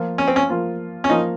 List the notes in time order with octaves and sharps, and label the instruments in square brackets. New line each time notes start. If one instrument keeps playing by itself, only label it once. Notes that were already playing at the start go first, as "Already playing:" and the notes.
Already playing: [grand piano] F3 A#3 F4
[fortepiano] C#4
C4
C#4
[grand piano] F3 A#3 F4
[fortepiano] C#4
[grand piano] F3 A#3 F4 [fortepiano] D#4